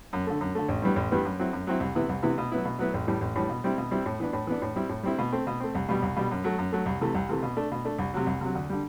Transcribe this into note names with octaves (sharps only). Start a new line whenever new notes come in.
F#2
D3 A3
F#2
D3 A3
A1
G2 E3 G3 B3
A1
G2 E3 G3 B3
F#2
F#3 C4 E4
F#2
F#3 C4 E4
C2
C3 E3 B3 E4
C2
C3 E3 B3 E4
B2
F#3 B3 E4
B2
F#3 B3 E4
A1
A2 E3 G3
A1
A2 E3 G3
B2
G3 C4 E4
B2
G3 C4 E4
A2
E3 B3 D4
A2
E3 B3 D4
A2
G3 C4 E4
A2
G3 C4 E4
B2
A3 C4
B2
A3 C4
C2
B2 G3
C2
B2 G3
F#2
F#3 A3
F#2
F#3 A3
C2
C3 E3 A3
C2
C3 E3 A3
B2
A3 D4
B2
A3 D4
C2
C3 F#3
C2
C3 F#3
D2
D3 G3